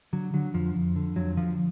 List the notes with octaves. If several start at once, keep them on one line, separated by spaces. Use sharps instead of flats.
D3 F#3
D3 F#3
F2 F3
F2
D3
F2 F#3
D3 F3